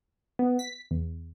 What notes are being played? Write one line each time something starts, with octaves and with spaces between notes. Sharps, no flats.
B3
B6
E2